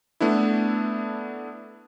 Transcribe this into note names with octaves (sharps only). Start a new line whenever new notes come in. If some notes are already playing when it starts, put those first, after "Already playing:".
A3 B3 D4 E4